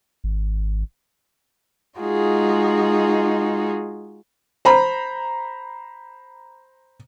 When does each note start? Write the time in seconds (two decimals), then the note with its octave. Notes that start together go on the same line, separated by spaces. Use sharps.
0.24 G#1
1.99 G#3 D#4 F4 F#4 G#4
4.65 C5 A#5 B5